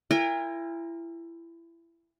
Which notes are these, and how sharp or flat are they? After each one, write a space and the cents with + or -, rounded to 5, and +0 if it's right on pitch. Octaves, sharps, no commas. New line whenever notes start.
E4 +25 A#4 +0 G#5 -45